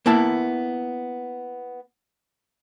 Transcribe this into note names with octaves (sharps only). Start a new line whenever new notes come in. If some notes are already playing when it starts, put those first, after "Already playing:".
A#3 B3 E4 A5